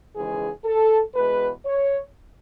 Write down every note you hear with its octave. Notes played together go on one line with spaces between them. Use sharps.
D#2 C#3 E3 G#3 G#4
A4
E2 B2 G#3 B4
C#5